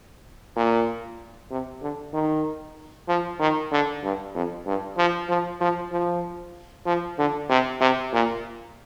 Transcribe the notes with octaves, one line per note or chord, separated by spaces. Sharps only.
A#2
C3
D3
D#3
F3
D#3
D3
G2
F2
G2
F3
F3
F3
F3
F3
D3
C3
C3
A#2